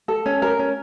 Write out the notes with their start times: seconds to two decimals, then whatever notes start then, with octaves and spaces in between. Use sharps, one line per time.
0.08 A4
0.26 C#4
0.42 A#4
0.59 C#4